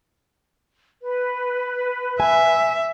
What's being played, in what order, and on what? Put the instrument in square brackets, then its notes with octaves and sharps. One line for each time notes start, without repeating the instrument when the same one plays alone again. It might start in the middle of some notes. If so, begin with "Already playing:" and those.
[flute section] B4
[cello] E5 [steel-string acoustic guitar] G#5